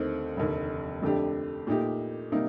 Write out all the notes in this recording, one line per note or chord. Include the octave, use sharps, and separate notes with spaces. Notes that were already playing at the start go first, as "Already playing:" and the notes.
Already playing: D#2 D3 A3 C4 D#4
F1 D#2 D3
F2 D3 A3 D4 G4
A#2 A3 D#4 G4
C3 G3 A#3 D#4